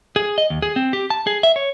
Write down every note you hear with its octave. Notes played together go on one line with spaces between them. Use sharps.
G#4
D#5
D#2
G#4
C4
G4
A5
G#4
E5
C#5